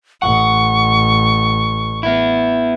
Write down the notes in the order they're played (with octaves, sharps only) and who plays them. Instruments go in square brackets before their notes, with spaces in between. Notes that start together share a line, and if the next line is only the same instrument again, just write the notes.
[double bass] A1 [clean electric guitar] F#5 [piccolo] C#6
[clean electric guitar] B3 E4